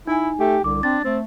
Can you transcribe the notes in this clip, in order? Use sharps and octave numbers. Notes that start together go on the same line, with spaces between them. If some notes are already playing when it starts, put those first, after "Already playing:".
D#4 E4 G#5
A3 G4
C2 D3 D6
C4 D4 A6
A3 C4